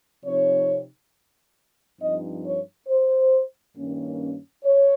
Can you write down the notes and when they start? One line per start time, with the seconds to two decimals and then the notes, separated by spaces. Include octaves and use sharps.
0.24 C3 F3 C4 D#4 C#5
2.00 G2 F3 C4 D#4 D#5
2.45 C#5
2.88 C5
3.76 G2 D#3 A#3 C#4
4.64 C#5